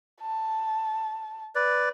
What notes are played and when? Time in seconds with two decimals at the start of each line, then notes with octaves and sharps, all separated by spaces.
0.21 A5
1.55 B4 D5